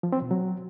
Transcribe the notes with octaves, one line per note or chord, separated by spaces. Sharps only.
F3
C4
B2
F#3